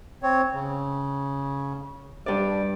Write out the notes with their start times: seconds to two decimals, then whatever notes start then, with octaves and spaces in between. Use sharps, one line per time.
0.23 C4 C#5
0.53 C#3
2.26 G2 G3 D5